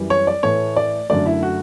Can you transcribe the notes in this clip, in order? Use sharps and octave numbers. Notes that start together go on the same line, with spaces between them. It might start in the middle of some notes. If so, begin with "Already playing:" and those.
Already playing: F#2 E3 G3
C#5
D5
A2 E3 A3 C#5
D5
F#2 D3 A3 D5
E4
F#4